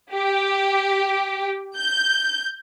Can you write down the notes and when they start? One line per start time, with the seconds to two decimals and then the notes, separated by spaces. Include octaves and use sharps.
0.13 G4
1.77 G6